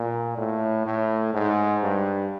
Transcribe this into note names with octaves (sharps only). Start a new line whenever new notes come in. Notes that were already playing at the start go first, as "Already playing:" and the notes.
Already playing: A#2
A2
A2
G#2
G2